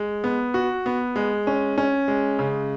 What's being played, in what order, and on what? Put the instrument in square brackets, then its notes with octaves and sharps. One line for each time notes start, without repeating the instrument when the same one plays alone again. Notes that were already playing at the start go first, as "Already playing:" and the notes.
Already playing: [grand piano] G#3
B3
F#4
B3
G#3
C#4
C#4
G#3
C#3